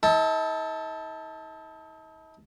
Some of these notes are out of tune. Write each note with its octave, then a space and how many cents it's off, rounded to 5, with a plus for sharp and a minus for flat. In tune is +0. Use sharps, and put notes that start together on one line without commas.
D#4 +45 A4 +0 A5 +0